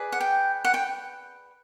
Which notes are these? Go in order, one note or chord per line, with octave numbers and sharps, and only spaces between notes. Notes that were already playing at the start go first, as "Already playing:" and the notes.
Already playing: G#4 B4 D5
F#5
G5
F#5
G5